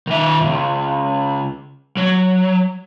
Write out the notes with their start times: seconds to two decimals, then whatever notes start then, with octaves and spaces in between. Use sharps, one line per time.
0.07 D#3 E5
0.41 C#2 F#2
1.97 F#3